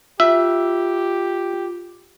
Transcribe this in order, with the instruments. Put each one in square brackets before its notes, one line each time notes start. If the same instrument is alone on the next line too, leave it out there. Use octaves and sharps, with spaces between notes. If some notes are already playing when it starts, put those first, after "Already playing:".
[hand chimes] F4 [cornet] G4 [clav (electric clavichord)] E5